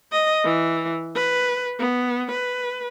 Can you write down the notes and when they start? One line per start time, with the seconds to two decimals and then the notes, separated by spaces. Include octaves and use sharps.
0.12 D#5
0.44 E3
1.15 B4
1.79 B3
2.32 B4